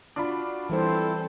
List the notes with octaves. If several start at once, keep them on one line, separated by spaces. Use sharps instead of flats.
D4 F4 F#4 B5
E3 G3 C4 E4 A4 C5